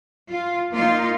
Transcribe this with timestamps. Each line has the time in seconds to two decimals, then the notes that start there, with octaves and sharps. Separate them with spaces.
0.29 F4
0.72 A#3 D#4 F4